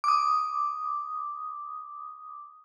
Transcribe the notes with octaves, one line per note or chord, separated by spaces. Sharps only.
D6 D#6